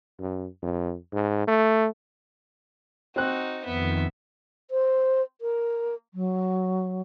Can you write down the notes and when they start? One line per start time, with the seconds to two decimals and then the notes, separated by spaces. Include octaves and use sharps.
0.20 F#2
0.63 F2
1.13 G#2
1.48 A3
3.16 C4 D#4 F#4 F#6
3.65 F2 D#3 B3 E5
4.71 C5
5.41 A#4
6.14 F#3